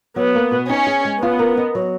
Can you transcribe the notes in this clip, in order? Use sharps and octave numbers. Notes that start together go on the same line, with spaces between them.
F#3 B3
A#3
B2
C#4 D#4
G#4
G#3
B3 F4
A#4
D#5
F#3